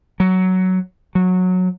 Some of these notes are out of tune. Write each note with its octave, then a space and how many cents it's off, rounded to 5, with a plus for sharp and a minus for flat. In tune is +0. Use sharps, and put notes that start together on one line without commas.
F#3 +10
F#3 -15